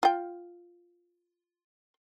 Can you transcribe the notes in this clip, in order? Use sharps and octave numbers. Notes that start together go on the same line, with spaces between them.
F4 G5